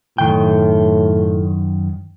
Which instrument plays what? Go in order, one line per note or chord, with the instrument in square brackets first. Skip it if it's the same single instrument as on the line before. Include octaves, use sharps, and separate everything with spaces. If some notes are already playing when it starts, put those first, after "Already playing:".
[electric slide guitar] F#2 D#3 G5 [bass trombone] A2